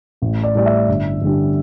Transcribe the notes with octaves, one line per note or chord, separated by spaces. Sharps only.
A1
D5
A2 G3 D5
E5
G1
G2 D3 G3